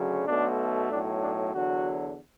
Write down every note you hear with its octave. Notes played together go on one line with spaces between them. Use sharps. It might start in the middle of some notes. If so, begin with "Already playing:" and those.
Already playing: D2 C#3 F#3
B1 B2 A3 D4
B1 A2 F#3 D4
D4
E2 D3 F#3 F#4